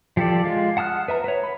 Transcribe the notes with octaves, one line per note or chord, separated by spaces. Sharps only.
F3 G4 A4 D5
G#3 F4
F#5 A5 D#6 F6 F#6
B4 E5 A#5
B4 C#5
B5